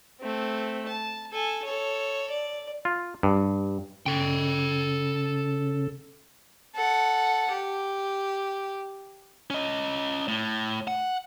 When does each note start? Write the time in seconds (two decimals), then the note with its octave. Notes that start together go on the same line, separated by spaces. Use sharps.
0.21 A3 C4
0.88 A5
1.32 A4 G#5
1.64 A4 C#5
2.30 D5
2.85 F4
3.23 G2
4.06 C#3 A4 G5
6.76 A4 F#5
7.52 G4
9.50 C#4 D#5
10.28 A2
10.88 F#5